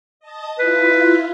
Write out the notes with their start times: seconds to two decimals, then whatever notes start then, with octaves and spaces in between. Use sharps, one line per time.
0.20 D#5 A5 D#6
0.59 E4 F4 B4